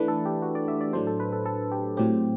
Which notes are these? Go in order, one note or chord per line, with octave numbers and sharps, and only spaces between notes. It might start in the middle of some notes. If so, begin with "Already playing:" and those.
Already playing: E3 A3 D4 B4
A4
G4
F#4
D5
E5
D5
A2 F#3 A3 D4 C5
A4
B4
A4
A4
G4
A2 F#3 C4 G4